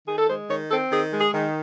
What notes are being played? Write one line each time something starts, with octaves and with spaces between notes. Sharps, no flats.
D#3 G#4
A4
G#3 C5
D#3 C#5
C4 A4
D#3 G#4
G#3
G#4
D#3